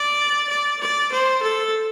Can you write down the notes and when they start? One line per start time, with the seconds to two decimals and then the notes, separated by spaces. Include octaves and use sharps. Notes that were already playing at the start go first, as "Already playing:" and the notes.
Already playing: D5
0.49 D5
0.80 D5
1.12 C5
1.42 A4